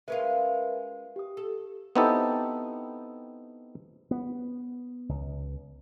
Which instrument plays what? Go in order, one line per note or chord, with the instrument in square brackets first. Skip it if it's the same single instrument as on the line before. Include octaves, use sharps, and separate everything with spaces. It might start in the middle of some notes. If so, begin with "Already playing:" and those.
[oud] G#3 C#4 F4 [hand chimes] A#4 B4 E5
[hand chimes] G4 D#6
[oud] A4
[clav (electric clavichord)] B3 C4 D#4 E4 G4 A4
[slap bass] B3
C#2